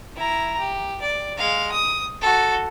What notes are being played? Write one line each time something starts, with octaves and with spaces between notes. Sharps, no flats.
E4 A#5
G4
D5
G#3 F5
D#6
F#4 A4